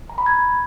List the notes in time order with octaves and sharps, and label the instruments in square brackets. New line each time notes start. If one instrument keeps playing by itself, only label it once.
[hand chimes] A#5
B5
G#6